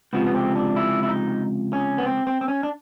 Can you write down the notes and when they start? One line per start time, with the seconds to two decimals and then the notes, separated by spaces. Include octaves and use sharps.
0.13 C#2 C3 F3 B3
0.25 B3
0.34 C4
0.55 D4
0.76 E4
1.03 E4
1.08 D#4
1.73 C#4
1.98 B3
2.05 C4
2.27 C4
2.41 C4
2.48 C#4
2.63 D4